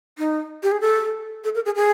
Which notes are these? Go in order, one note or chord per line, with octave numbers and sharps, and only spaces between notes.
D#4
G4
G#4
A4
A4
A#4
G#4
G#4